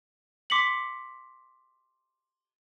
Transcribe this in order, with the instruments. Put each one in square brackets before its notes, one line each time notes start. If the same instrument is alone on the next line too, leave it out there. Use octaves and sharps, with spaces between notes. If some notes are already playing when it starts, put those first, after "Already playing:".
[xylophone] C6 D6 B6 C#7 F#7